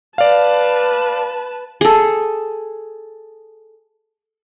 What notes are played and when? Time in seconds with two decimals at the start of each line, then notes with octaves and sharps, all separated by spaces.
0.18 B4 D5 F5 A5
1.81 G#4 A4